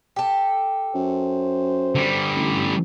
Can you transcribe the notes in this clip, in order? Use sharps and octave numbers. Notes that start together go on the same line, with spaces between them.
G4 A4
F#2 C5
D3 G3
A1